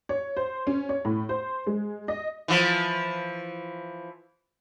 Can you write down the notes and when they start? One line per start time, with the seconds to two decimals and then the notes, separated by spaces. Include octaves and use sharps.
0.09 C#5
0.37 C5
0.67 C#4
0.89 C#5
1.05 A2
1.29 C5
1.67 G#3
2.08 D#5
2.48 E3 F3